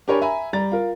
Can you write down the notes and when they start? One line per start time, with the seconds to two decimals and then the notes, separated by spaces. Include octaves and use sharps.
0.08 D4 G4 A#4 C#5 G#5 B5
0.21 E5 G#5 A#5 B5
0.53 G3 A#5 A6
0.72 F4 A#4